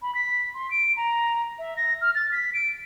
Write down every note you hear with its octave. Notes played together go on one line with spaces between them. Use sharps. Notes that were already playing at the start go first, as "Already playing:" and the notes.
B5
B6
C6
D7
A#5
E5
A#6
F6
A6
B6
D7